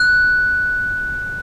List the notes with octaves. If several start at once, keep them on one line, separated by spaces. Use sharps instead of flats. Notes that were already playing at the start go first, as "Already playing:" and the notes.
Already playing: F#6